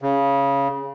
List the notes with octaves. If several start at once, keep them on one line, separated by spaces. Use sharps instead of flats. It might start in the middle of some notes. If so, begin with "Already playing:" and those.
C#3